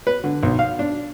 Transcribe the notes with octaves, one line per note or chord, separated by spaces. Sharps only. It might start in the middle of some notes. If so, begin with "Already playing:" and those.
B4
D3
B1
F5
D4